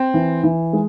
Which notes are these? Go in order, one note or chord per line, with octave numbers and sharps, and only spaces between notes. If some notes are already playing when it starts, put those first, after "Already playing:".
Already playing: C4
E3
E3
G#3